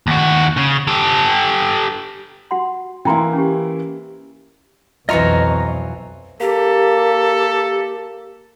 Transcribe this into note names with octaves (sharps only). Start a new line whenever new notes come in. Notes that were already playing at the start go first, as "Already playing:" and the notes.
D#2 F#4
C#3
G4 A4
F#4 F#5 C6
E3 A#3 E4 G5 A#5 C6
C#4 G4
B1 F2 E3 F#3 F4 D#5 A#5 C#6
A#3 G4 A4